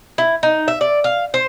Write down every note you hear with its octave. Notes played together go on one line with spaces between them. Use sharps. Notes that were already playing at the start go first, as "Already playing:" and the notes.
E4
D#4
E5
D5
F5
C5